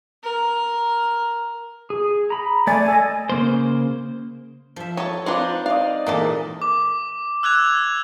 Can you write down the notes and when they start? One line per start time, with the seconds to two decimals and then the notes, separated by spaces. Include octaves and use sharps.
0.24 A#4
1.90 G#4
2.30 A#5 B5
2.67 A3 D5 G#5
2.88 A4 D#5
3.29 C#3 A#3 C5
4.76 F3 E5
4.97 A4 C#5 D#5
5.26 C4 D4 D#4 F4 B4 C5 F#5
5.66 D5 D#5 F5
6.06 A#2 E3 G#3 A#3 A4
6.62 D6
7.43 E6 F#6 G#6 F7